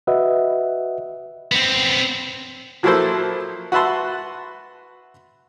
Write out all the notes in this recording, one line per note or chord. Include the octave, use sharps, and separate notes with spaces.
F#4 B4 D#5 E5 F#5
B3 C4
F3 F#3 A#3 E4 A4 C5
F#4 B4 E5 A5 C6